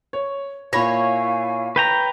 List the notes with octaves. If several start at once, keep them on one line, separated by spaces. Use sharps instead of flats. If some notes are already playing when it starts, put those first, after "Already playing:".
C#5
A#2 E4 C#5 F5 G#5 B5 A#6
B4 G5 A#5 G6